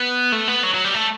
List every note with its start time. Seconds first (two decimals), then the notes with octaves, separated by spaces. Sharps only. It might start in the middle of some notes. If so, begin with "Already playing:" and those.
Already playing: B3
0.32 A3
0.48 B3
0.63 F#3
0.74 F#3
0.84 G3
0.94 A3